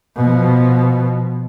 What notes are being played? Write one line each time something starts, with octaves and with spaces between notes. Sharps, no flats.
B2 F3